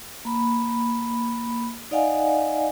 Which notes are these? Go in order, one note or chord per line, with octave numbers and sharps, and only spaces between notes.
A#3 B5
D#4 D5 D#5 F5 F#5 G#5